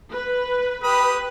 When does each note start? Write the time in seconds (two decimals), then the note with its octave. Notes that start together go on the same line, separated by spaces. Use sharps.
0.12 B4
0.84 G4 B4 B5 D#6